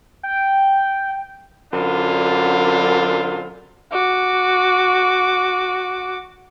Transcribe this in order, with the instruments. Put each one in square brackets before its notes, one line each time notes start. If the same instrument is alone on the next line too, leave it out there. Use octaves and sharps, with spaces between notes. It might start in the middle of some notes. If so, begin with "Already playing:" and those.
[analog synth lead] G5
[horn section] F#2 D3 C4 D4 F4
[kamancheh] F#4 D6